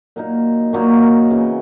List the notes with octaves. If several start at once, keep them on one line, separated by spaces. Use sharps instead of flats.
A#2 F#3 A#3 D#4
A#2 F#3 A#3 D#4
C#3 E3 B3